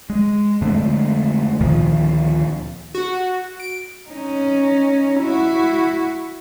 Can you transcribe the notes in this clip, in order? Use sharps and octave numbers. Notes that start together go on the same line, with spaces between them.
G#3
F2 D3 G#3 A3
D2 A#2 D#3 F3
F#4
D7
C#4 D#4
E4 F#4